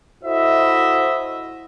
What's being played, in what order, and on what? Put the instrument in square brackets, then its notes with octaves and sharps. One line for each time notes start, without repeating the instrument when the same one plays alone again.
[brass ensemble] E4 F#4 A4 C5 D#5 E5